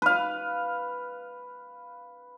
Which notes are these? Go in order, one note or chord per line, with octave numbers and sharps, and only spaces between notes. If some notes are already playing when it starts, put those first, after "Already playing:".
B4 F5